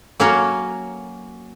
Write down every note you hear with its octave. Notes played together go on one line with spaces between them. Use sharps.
F#3 A#3 C#4 F#4